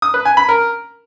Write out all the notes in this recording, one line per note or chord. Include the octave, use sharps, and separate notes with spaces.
D#6
B4
G#5
B5
A#4